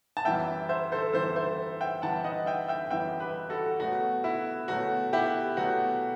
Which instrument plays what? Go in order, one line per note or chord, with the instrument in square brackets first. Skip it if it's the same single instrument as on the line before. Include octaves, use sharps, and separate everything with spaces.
[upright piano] A5
F#2 E3 G3 E5 G5
C5 E5
A4 C5
F#2 E3 G3 A4 C5
C5 E5
E5 G5
F#2 E3 G3 F#5 A5
D#5 F#5
E5 G5
E5 G5
F#2 E3 G3 E5 G5
G4 B4
F#4 A4
B2 F#3 A3 F#4
E4
B2 F#3 A3 F#4
E4 G4
B2 F#3 A3 F#4